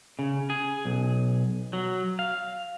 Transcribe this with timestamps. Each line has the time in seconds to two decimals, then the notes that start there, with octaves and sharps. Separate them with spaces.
0.19 C#3
0.50 G#4
0.85 B1
1.73 F#3
2.19 F5